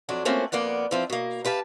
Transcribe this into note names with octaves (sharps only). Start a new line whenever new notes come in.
F2 F#3 D4
A3 A#3 C4 C#4 F4 F#4
F2 A#3 B3 D5 F#5
E3 F3 C4
B2 A#3
G4 B4 F5 A5